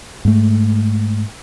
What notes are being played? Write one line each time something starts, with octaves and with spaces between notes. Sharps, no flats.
G#2 A3